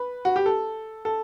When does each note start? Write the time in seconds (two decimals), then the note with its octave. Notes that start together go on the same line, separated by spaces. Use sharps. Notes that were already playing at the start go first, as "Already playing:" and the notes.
Already playing: B4
0.25 F#4
0.36 G4
0.46 A4
1.05 A4